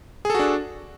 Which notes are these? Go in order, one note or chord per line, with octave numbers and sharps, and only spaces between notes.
D4 F#4 G#4 A4